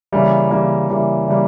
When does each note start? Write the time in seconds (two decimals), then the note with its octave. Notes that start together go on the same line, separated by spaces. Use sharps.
0.12 C#3 E3 G3 A#3
0.51 C#3 E3 G3 A#3
0.89 C#3 E3 G3 A#3
1.28 C#3 E3 G3 A#3